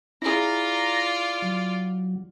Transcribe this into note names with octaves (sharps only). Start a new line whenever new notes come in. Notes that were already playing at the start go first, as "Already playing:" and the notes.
E4 F4 G#4 D5 A#5 A#6
F#3